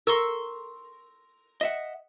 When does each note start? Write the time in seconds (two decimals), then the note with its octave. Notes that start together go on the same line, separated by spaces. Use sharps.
0.07 A#4 C6 C#6 E6
1.61 D#5 E5 F#5